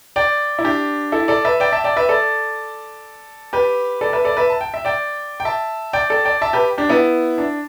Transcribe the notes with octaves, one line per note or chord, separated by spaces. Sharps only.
D5 G5
E4
D4 G4
E4 A4
A4 D5
B4 E5
D5 G5
E5 A5
D5 G5
B4 E5
A4 D5
G4 B4
A4 D5
B4 E5
A4 D5
B4 E5
A5
G5
E5
D5 G5
G5
E5 A5
D5 G5
A4 D5
D5 G5
E5 A5
G4 B4
D4 G4
B3 E4
D4